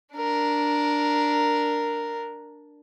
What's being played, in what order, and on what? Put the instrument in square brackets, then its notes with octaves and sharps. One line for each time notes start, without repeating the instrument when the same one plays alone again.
[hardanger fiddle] D4 A#4